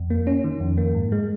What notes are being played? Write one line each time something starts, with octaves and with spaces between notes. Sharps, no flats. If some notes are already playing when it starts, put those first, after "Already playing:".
Already playing: F2
A#3
C#4
D#3
F2
A#3
G#2
G#3